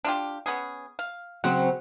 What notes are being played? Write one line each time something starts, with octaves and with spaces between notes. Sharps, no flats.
D4 F4 G4
B3 C#4 G#4
F5
C#3 F#3 C4 F#5